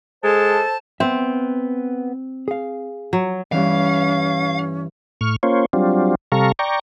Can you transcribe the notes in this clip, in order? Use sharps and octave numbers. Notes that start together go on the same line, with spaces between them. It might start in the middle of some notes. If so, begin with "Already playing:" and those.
G#3 A4 C5 A5
B3 C4 E5
G#4 F5
F#3
G2 E3 C#4 F5
A2 C#6 F6
A#3 C#4 F4 C5 C#5
F#3 G3 C4 D4 F4
C3 G3 A4 F5 A#5 C#6
D5 G5 A#5 C#6